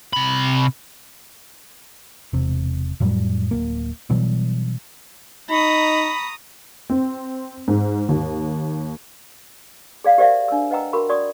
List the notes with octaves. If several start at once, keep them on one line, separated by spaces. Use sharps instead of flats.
C3 B5
E1 C3
F2 A2 F#3 G3
D1 F2 A#3
B2 E3 F#3 G3
D#4 A#5 B5 C#6 D#6
C4
G#2
D#2
G#4 D5 F5
G4 A#4 C5 D5 E5 F5
D4 E6
B4 D#5 F#5 G5 A#5 E6
F#4 A#4 B5 C#6
F#4 D5 C#6 D#6